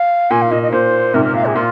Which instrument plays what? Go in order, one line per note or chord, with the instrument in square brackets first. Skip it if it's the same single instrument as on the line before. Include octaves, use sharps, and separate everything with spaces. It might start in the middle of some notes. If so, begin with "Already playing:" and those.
Already playing: [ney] F5
[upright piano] A#2 [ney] G#5
[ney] F5
[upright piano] A#2 [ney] D#5
[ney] D#5
[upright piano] A#2 [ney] C5
[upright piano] G#2 C3 [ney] A#4
[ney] A#4
[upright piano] A#2 [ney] F5
[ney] G#4
[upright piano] A#2 [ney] F4